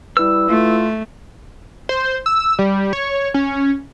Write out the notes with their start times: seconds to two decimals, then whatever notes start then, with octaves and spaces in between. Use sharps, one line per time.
0.17 G3 E4 B4 E6
0.49 A3 F4
1.89 C5
2.26 E6
2.59 G3
2.93 C#5
3.34 C#4